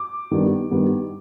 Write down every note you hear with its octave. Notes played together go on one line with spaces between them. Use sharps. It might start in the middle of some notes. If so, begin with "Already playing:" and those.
Already playing: D6
G2 D#3 G3 B3
G2 D#3 G3 B3